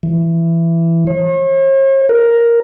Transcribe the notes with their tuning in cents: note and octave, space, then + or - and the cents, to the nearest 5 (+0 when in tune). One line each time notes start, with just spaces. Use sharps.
E3 +15
C#5 -45
A#4 +5